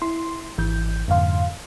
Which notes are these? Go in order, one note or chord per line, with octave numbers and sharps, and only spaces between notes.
E4 C6
G#1 E3 G6
F2 G#2 D3 F5 C6